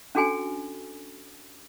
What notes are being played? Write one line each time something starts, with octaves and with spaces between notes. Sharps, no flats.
C#4 D4 F#4 A4 G5 G#5